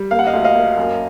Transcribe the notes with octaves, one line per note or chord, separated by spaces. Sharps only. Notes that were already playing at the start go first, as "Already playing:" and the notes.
Already playing: G3
A#3 F5
F#5
D#5 F5
D2
D#5 F5
A#3
F#2